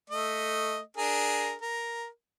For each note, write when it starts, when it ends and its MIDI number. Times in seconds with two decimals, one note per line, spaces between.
0.10 0.79 57
0.10 0.79 75
0.97 1.54 62
0.97 1.54 68
0.97 1.54 70
1.62 2.07 70